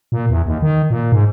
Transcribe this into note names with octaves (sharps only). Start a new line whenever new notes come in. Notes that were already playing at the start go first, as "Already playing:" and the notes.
A#2
E2
D#2
D#3
A#2
G#2